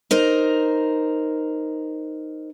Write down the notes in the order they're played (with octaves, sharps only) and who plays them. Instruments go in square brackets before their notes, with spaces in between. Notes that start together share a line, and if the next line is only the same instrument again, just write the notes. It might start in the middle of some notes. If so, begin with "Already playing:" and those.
[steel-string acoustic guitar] D#4 A#4 C5